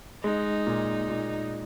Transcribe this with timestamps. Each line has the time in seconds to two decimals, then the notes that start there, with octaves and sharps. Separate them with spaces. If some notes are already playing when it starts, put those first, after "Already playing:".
0.24 G#3 D#4
0.67 A#2
1.10 A#2